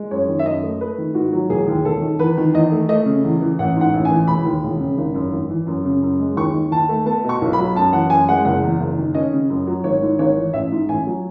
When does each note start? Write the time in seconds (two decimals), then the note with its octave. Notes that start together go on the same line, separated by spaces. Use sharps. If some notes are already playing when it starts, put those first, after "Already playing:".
Already playing: G#3
0.11 F#2 C#5
0.28 D#3
0.39 E5
0.46 F#2 D#5
0.63 A3
0.81 A3 B4
0.98 D#3
1.14 G#2 F#4
1.33 F#3
1.49 E1 G#4
1.68 D#2
1.84 E1 A4
2.01 D#3
2.19 E2 B4
2.37 D#3
2.54 E2 D#5
2.72 A3
2.89 A3 D#5
3.06 C#3
3.24 E2
3.41 E3
3.59 A1 F#5
3.76 G#2 F#5
3.94 A1
4.05 G#5
4.10 E3
4.27 E1 B5
4.45 D#2
4.63 E1
4.80 C#3
4.98 G#1
5.14 F#2
5.32 G#1
5.49 E3
5.67 F#2
5.85 C#3
6.03 F#2
6.19 G#3
6.37 D#2 C#6
6.54 D#3
6.72 D#2 A5
6.89 A3
7.06 B3 A5
7.24 B2 C#6
7.42 B1
7.53 F#3 B5
7.75 F#2 A5
7.93 E3 F#5
8.10 F#2 G#5
8.28 G#3 F#5
8.45 F#1 F#5
8.63 E2
8.80 F#1
8.98 D#3
9.14 C#4 D#5
9.33 C#3
9.49 F#2
9.67 F#3
9.84 G#1 C#5
10.02 G#2
10.19 G#1 C#5
10.36 E3
10.53 A1 E5
10.72 G#2
10.88 A1 G#5
11.07 F#3